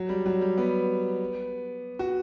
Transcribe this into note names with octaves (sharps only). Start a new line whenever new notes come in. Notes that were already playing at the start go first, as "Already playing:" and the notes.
Already playing: F#3
G3
F#3
G3
B3
F#4